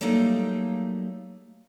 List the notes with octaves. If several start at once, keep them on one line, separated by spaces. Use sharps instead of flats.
F#3 G3 A3 A#3 D#4